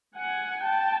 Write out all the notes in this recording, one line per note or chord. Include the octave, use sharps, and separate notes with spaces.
F#5 G#5
G5 A5